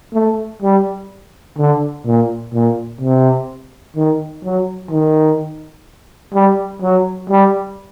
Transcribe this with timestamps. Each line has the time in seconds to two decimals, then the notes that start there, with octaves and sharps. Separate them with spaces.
0.14 A3
0.62 G3
1.58 D3
2.06 A#2
2.54 A#2
3.01 C3
3.96 D#3
4.44 F#3
4.91 D#3
6.34 G3
6.82 F#3
7.30 G3